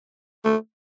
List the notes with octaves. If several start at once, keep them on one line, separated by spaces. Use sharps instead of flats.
A3